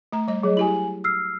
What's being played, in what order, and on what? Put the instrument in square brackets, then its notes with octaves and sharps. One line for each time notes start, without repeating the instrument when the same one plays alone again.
[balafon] A3 A#5
G3 D#5
[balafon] F#3 [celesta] G#4 C#5 D#5
[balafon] E4 G4 G#4 [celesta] G#5 F#7
[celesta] E6 F6 C7